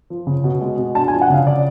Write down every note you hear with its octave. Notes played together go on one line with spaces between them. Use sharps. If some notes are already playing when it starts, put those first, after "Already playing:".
F3
C#3
B2
G#3
B2
D4 A5
G#5
F3
F#5
C#3 F5
D5